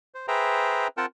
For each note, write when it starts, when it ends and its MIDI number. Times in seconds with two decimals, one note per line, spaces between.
0.14 0.27 72
0.28 0.87 68
0.28 0.87 71
0.28 0.87 72
0.28 0.87 76
0.28 0.87 79
0.28 0.87 82
0.97 1.06 60
0.97 1.06 65
0.97 1.06 70
0.97 1.06 78
0.97 1.06 79
0.97 1.06 81